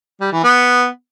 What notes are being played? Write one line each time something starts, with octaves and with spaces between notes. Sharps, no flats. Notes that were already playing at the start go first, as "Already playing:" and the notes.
G3
E3
B3